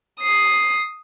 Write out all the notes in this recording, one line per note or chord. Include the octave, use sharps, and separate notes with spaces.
D#6 C7